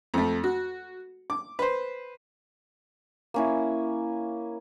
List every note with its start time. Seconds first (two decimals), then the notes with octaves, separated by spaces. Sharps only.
0.14 F2 A3
0.44 F#4
1.30 D6
1.59 B4 C5
3.34 A#3 C#4 E4